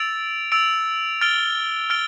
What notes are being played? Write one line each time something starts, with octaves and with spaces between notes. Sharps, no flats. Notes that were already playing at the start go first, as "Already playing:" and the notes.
Already playing: E6 A6 D7 F7
E6 A6 D7 F7
F6 A6 D7 G7
F6 A6 D7 G7